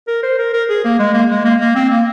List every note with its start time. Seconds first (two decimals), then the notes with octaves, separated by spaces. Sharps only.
0.08 A#4
0.23 C5
0.38 A#4
0.53 A#4
0.69 G#4
0.84 A#3
0.99 G#3
1.14 A#3
1.30 G#3
1.45 A#3
1.60 A#3
1.75 C4
1.90 A#3